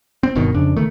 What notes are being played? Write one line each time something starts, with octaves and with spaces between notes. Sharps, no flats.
C4
G1 B2 D#3
F2 C#3 D4
C#2 D#3 A3